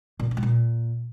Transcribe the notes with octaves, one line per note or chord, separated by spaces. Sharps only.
A#2
D3
B2
A2
A#2